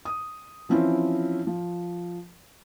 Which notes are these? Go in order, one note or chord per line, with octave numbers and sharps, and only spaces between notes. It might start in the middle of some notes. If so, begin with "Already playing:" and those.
D#6
E3 F3 C4 C#4 E4
F3